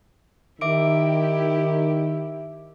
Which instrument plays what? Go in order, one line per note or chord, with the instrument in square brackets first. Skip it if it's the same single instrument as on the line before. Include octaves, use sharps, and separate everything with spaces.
[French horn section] D#3 [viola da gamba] E4 G4 [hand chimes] E5 D6 D7